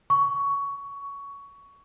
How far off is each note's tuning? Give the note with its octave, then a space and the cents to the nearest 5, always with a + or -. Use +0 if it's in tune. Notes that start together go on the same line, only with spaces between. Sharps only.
C#6 +15